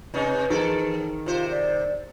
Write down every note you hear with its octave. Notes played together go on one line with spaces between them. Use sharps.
C3 C#4 D#4 B4 D#5
D#3 E3 D#4 G#4 A4
C3 F4 C5
D5